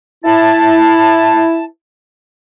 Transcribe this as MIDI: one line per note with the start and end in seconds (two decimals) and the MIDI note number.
0.25 1.64 64
0.25 1.64 81